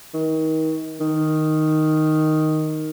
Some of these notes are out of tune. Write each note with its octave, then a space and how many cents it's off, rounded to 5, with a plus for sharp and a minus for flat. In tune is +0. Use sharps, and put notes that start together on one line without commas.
D#3 +30
D#3 +0